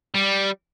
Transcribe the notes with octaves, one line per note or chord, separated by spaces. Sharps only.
G3